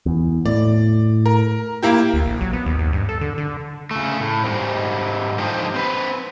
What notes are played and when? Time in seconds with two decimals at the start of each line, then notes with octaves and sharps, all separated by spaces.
0.06 E2
0.46 A2 D5
1.26 A#4
1.83 A#3 E4 G4
2.14 D2
2.26 A#1
2.41 F#3
2.53 B3
2.66 D#2
2.78 D#2
2.93 G2
3.09 A4
3.21 D3
3.38 D3
3.91 C#3 A3
4.21 A2
4.44 G#2 G3 C4
5.38 D3 F3 D#4 G4 C5
5.74 C4 B4